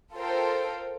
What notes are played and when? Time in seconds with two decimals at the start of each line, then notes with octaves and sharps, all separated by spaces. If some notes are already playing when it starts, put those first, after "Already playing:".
0.12 F4 A4 A#4 C5 G5